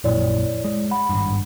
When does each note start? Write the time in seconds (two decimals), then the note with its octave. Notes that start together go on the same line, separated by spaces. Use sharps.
0.04 A#1 F#2 A#2 E4 C#5 D5
0.65 G#3
0.91 F#5 B5
1.10 G#1 G2